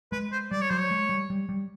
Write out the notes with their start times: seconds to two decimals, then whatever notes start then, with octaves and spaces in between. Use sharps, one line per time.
0.12 G#3 B4
0.32 C5
0.52 G3 D5
0.61 C#5
0.70 F#3 C5
0.80 C#5
0.91 G#3
1.09 G3
1.30 G3
1.49 G3